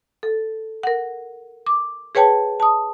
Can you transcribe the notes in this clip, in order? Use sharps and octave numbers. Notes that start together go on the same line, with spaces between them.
A4
A#4 F#5
D6
G#4 B4 C#5 G5 A5
A5 D#6